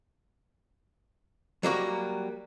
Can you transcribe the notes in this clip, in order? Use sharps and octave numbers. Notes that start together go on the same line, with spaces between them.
F#3 G3 A#3 F#4